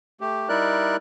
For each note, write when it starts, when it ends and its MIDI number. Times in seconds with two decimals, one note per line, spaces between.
0.21 0.49 57
0.21 0.49 67
0.49 0.96 55
0.49 0.96 63
0.49 0.96 64
0.49 0.96 70
0.49 0.96 74
0.49 0.96 90